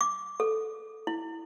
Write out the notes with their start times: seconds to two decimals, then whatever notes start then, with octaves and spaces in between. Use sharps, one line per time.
0.01 D6
0.40 A4
1.07 E4